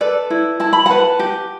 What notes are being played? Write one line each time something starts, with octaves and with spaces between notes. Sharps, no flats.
A4 B4 D5
E4
E4 A5
B5
B4 F#5 A5
G4